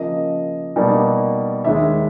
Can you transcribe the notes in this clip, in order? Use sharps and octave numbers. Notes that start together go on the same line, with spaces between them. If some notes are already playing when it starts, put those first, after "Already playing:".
Already playing: C#3 F3 A#3 D#5
B2 G3 A#3 D#4
D#2 D#3 G#3 E5